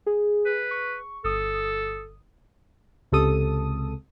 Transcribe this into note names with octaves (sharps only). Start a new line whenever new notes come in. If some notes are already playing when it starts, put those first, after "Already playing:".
G#4
B4
C#6
G1 A4 D#6
C#2 C3 A4 D#6